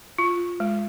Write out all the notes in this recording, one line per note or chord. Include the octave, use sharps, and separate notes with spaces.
F4
G#3